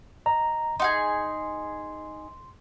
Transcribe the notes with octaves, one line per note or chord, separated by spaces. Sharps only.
D#5 A#5
D#4 F#4 G#4 C6